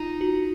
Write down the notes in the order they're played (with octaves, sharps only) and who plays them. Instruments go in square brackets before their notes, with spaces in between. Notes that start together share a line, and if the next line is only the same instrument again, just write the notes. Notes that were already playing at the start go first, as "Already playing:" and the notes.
Already playing: [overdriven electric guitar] D#4 [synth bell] F4
[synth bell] F#4